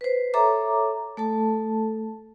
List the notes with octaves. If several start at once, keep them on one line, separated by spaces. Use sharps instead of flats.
B4 C5
A4 C#5 E5 A#5 D6
A3 A4 A5